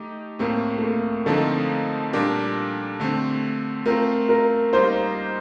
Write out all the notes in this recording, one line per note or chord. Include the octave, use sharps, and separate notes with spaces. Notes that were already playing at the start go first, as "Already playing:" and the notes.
Already playing: A3 D#4 G4
A2 A3 A#3 C4
A3
A#3
D3 F3 A3 C4 D#4 A4
A#2 G3 D4 G4 A#4
D3 A3 C4
A3 C4 F4 A#4
A#4
G3 A#3 D#4 C5